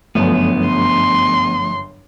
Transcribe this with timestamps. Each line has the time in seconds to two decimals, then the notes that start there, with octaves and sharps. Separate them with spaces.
0.15 G1 F#2 F3 A3 B3 D4
0.67 C6